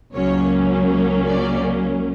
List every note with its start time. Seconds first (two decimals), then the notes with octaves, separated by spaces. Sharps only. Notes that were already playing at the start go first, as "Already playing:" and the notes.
0.14 C#2 C#3 F#3 A#3 C#4 C#5
1.26 D5